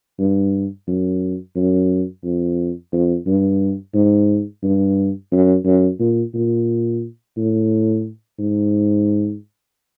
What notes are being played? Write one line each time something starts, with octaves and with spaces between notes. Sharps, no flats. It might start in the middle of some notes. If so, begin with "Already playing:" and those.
G2
F#2
F#2
F2
F2
G2
G#2
G2
F#2
F#2
A#2
A#2
A2
G#2